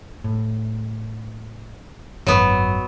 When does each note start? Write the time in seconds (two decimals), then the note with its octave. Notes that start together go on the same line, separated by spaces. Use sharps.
0.24 A2
2.27 G#1 F#2 F#3 B3